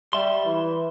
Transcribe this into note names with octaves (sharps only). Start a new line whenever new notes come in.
G3 E5 C6
E3